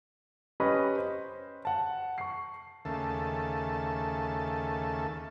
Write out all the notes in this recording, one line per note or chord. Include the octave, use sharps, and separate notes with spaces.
C#4 G4 B4 D#5 B5
C5
F#5 A5
C#6 C7
D#2 C#3 A3 A5